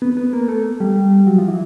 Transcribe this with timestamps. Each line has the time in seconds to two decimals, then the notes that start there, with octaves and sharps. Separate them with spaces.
0.02 B3
0.17 B3
0.33 A#3
0.48 A3
0.80 G3
1.27 F#3
1.38 F3
1.48 E3